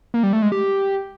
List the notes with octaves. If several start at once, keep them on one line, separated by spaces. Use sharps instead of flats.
A#3
G3
A3
G#3
G4